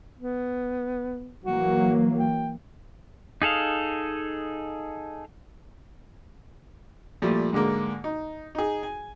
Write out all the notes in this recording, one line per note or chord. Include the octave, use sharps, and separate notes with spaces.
B3
E3 F#3 A#3 F#4
G5
D#4 G#4 A4 F5
A#2 F3 G3 A3
G#2 D3 G#3 A#3
D#4
D#4 G#4
G#5